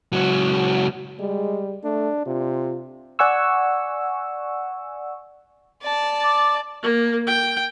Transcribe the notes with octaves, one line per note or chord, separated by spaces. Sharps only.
C#2 F#3
G3 G#3
A3 D4
C3 F4
D5 F#5 G#5 C#6 E6
D5 A5
D6
A#3
G5